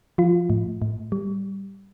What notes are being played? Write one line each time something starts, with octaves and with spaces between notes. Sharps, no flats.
F3 F4
A2
A2
G3